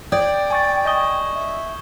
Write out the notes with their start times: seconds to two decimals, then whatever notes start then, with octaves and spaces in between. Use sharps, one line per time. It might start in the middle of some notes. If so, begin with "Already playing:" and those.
0.12 D5 G5 D#6 G6 G#6
0.51 G#5 C#6 A6
0.85 D#5 G#5 C#6 D#6 G6 G7
1.35 E5